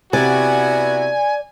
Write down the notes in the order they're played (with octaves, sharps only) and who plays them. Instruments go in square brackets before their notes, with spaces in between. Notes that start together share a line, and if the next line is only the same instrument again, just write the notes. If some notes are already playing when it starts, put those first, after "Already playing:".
[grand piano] C3 [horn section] B3 E4 F#4 [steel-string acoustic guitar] D5 [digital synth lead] G#5